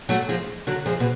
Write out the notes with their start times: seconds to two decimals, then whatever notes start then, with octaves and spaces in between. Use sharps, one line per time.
0.09 F#3 A3
0.29 F3 G#3
0.67 D3 F#3
0.86 F3 G#3
1.00 B2